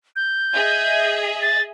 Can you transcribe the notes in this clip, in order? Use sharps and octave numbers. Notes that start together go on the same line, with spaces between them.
G6
G#4 D#5 E5
A6